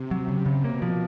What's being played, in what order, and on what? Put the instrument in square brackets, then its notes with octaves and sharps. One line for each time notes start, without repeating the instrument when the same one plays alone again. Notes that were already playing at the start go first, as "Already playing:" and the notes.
Already playing: [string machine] C3
[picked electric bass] F#3
C#3
C#3
[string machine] B2 [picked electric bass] A#3
[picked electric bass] F3